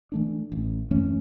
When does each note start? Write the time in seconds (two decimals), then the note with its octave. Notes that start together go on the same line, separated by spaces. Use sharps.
0.12 E3 A3 D4
0.52 A1
0.91 F#2 E3 A3 C#4